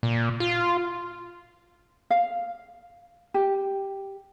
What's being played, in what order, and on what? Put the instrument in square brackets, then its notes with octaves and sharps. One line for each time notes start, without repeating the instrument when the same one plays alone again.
[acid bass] A#2
F4
[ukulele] F5
G4